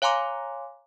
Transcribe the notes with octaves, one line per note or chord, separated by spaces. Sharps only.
C#5 F5 G#5 A#5 C6 D6